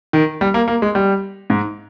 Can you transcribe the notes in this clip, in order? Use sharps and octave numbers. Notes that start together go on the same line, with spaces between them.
D#3
G3
A#3
A#3
G#3
G3
G#2